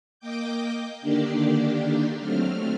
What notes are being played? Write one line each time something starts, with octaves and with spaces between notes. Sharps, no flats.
A#3 D#5 G5 D6 G6
D3 D#3 A#3 D4 G4 D5
F#3 A3 C4 F6